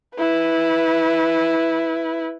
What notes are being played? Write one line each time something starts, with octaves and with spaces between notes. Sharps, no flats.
E4 B4